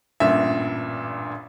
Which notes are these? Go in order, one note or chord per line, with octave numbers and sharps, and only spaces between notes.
A1 G2 A#2 E5